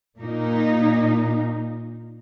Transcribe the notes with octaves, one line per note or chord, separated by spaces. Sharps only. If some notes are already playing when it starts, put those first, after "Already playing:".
A#2 A#3 D#4